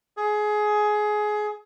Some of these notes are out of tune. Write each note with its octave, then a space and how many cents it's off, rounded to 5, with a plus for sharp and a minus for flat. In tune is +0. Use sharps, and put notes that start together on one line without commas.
G#4 +20